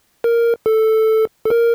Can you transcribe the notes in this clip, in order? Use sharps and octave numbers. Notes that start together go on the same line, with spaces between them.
A#4
A4
A4
A#4